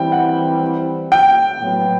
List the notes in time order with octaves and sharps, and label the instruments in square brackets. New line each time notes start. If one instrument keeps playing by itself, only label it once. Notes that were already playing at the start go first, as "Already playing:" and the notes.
Already playing: [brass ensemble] E3 G3 C4 E4 [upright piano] G5
[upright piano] F#5
G5
[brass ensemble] A2 F#3 B3